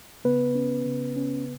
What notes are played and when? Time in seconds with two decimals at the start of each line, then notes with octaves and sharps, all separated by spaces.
0.24 C#3 B3 B4
0.55 C#4
0.86 C#3
1.16 C#4